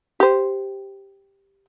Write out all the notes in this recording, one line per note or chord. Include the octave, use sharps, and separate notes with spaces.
G4 C5